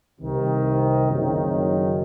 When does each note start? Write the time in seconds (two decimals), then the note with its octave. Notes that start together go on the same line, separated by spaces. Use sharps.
0.21 C2 C3 D#3
1.08 F#1 F#2 D#3